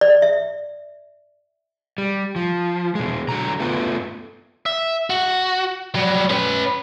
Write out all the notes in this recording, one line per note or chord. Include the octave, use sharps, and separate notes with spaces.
D5
E5
G3
F3
B2 G#3
D3 F#3 A#5
A3 B3 F4 B4
E5
F#4
F#3 G3
C#4 B4